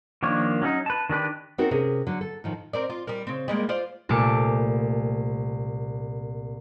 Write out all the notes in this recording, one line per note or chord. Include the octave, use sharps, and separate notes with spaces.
D#3 F3 A#3 D4 C#5
F#3 C#4 D#4
B4 A5
D#3 D4 G4 B4
C4 C#4 D#4 F#4 A4 A#4
C3 C#4 G#4 A#4
D3 F#3
A4
A2 D#3 F3
C4 A#4 D5
F4
G3 A#4
C#3 C4
G3 G#3 A#3
F4 C5 D5
C2 A#2 A3 D6 C#7